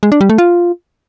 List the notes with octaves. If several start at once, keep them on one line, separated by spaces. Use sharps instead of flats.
G#3
D4
G3
A3
F4